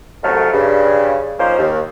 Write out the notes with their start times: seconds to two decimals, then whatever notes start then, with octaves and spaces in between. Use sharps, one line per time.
0.23 C2 F#2 A2 F#3 A3 F6
0.53 G2 C#3
1.39 F3 A#3 C#4 D#4 C5
1.59 D#2